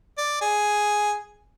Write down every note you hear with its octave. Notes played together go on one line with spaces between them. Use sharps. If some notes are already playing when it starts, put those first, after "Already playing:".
D5
G#4